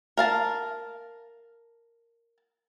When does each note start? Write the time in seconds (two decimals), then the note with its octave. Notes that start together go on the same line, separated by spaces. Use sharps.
0.17 A#4 F5 A5